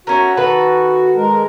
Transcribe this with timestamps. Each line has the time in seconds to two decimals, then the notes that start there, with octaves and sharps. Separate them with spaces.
0.07 A3 C#4 F#4 A#4
0.37 D#3 A4 B4
1.16 G#3 A#4